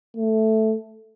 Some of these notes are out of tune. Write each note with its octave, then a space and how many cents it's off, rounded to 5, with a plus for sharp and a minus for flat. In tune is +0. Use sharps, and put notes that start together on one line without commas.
A3 +0